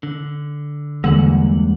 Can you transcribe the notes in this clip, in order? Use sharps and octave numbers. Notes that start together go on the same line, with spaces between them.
D3
E2 G2 D3 G#3 A#3 F#5